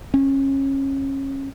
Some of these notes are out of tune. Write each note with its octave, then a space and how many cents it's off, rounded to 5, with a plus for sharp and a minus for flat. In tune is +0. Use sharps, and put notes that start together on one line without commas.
C#4 -25